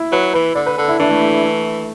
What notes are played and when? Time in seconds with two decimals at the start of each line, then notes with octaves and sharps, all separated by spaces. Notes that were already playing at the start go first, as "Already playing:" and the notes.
Already playing: E4
0.12 F#3 B4
0.33 E3 B4
0.55 D3 D5
0.66 B4
0.78 D3 A4
0.88 E4
0.99 E3 D4
1.10 A3
1.21 A3
1.43 A3